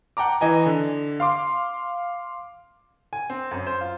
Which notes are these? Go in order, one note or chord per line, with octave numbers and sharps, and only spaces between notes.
F#5 G5 A5 A#5 D6
E3 D#5 G#5 A#5
D3
F5 C6 D6
G#5
C4
F#2
C5
F4